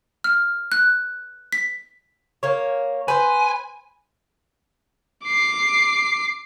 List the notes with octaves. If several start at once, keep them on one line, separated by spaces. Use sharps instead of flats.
F6
F#6
B6
A#3 C#5
B4 C5 G#5
D6 C7